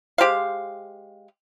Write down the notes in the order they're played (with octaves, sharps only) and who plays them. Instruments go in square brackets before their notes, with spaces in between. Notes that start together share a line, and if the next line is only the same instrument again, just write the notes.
[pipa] G#3 G4 C5 F5